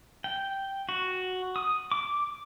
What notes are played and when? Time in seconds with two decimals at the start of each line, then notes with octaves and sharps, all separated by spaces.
0.24 G5
0.89 F#4
1.56 D#6
1.92 D6